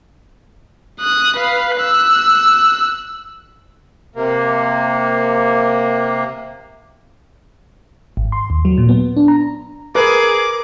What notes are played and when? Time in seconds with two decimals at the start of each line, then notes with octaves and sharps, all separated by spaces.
1.00 D#6 F#6
1.36 B4 F5
1.77 E6 F#6
4.16 C3 A#3
8.17 G#1
8.32 C6
8.50 D#2
8.65 F#3
8.78 A#2
8.89 B3
9.16 D4
9.28 A#5
9.95 G#4 A#4 B4 D6